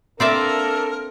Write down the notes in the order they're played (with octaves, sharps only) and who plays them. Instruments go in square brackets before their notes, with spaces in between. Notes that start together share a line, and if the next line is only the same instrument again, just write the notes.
[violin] A#3 D4 [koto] C4 D5 E5 [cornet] A4 [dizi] A#4